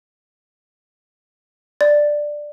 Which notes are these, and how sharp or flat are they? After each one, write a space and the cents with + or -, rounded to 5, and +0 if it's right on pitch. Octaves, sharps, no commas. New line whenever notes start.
D5 +10